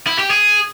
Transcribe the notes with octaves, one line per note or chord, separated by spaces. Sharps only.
E4
G4
G#4